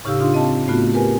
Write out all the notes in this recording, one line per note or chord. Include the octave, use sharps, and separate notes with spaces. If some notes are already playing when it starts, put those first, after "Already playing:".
A2 C#3 D#4 G4 F5 E6
D4 D#4 F4 F5 C6
C4 D#5 F5 A5
A2 A3 B3 F4 F#4
G4 A#4 B4 G#5